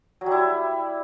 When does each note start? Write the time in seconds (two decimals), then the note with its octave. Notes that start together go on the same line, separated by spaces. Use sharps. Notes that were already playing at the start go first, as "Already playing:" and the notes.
0.21 F#3
0.26 G3
0.32 E4